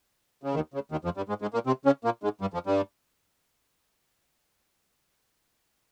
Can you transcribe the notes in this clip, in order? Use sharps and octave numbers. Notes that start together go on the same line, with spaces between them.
C#3
D#2 D#3
C#3
D#2 D#3
F2 F3
G2 G3
G#2 G#3
G#2 G#3
A#2 A#3
C3 C4
C#3 C#4
A#2 A#3
G#2 G#3
G2 G3
F2 F3
G2 G3